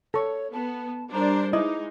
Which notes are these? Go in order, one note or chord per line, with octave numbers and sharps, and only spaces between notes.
A4 C#5 C#6
B3 A5
G3 D4 A#4 C5 A#5
G#3 D#4 E4 D#5 D6